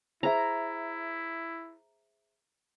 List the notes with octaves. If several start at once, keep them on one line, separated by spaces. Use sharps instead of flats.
E4 G#4 C5 E5 A#5